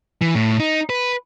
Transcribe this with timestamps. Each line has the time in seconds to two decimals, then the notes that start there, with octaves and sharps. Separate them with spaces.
0.22 E3
0.35 A2
0.60 D#4
0.90 B4